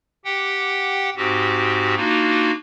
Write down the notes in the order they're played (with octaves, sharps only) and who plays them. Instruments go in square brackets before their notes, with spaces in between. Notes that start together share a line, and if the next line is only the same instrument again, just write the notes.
[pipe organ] G4 F#5 G5
G#2 C4 F#4 G4
A#3 D4 D#4 F4 F#4